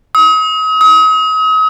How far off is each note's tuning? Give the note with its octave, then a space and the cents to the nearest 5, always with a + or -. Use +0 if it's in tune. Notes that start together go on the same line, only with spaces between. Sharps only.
D#6 +40
D#6 +40